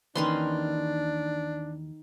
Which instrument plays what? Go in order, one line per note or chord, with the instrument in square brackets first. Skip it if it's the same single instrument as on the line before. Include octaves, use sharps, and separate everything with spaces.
[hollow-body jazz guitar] D#2 E3 B4 [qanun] D#3 C#4 C6 [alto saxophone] D4